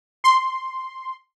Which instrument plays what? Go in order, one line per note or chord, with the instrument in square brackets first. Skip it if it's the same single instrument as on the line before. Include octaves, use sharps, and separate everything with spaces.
[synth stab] C6